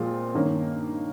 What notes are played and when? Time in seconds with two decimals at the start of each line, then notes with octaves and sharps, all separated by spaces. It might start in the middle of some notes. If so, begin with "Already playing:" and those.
Already playing: A#2 F3 G#3 C4 F4
0.34 G2 D#3 A#3 C#4